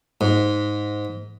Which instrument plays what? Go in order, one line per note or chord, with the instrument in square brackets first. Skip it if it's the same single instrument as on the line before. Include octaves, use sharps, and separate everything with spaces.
[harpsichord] G#2